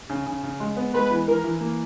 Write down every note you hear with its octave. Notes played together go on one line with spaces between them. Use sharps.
C#3
C#3
C#3
G#3
B3
G#3 B4
E3
E3 A#4
E3
A#3